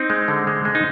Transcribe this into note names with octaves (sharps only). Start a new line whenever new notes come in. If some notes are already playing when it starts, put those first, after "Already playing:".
Already playing: C4 D#4
G#3
D3
G#3
G#3
D#4